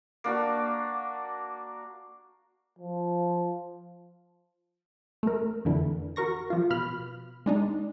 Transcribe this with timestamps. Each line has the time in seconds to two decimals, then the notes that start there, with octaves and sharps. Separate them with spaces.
0.24 A#3 D4 F#4
2.79 F3
5.23 A3 A#4
5.65 F2 D3 E3
6.16 F#4 A#4 C#6 A#6
6.50 F3 F4
6.70 B2 B5 F6
7.46 G#3 D4 D#4